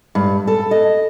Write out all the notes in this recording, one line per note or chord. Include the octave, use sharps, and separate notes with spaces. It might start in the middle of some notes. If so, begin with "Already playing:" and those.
G2
A4
D#5